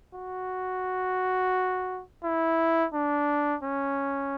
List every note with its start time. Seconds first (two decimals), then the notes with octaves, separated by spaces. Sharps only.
0.14 F#4
2.24 E4
2.93 D4
3.63 C#4